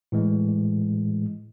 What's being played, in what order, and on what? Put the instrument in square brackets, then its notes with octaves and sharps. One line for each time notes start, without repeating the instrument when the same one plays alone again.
[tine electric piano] A2 E3 G#3